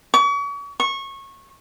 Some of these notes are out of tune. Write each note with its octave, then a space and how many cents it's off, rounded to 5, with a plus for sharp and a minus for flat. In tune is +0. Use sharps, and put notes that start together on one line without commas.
C#6 +40
C#6 -20